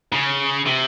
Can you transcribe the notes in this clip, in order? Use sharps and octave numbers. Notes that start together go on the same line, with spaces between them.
C#3
C3